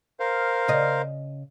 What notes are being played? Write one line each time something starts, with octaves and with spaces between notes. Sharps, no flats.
A#4 C5 F5
C#3 D#5